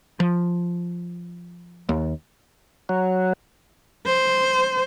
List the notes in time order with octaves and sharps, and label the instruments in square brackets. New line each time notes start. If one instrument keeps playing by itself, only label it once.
[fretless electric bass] F3
D#2
[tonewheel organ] F#3
[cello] C5